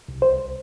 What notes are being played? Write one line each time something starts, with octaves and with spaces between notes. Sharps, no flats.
C2
C5